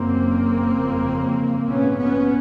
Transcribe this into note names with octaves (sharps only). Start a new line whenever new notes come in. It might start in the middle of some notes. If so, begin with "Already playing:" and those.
Already playing: F#1 F#2 C#3 A#3 C4
G1 F2 C#3
A#1 G#2 B3 C#4
B3 C#4